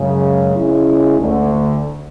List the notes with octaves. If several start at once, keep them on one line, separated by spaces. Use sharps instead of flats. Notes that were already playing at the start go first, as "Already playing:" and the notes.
Already playing: F#2 C#3 G#3
C#3 G#3 C#4 E4
D2 D3 A3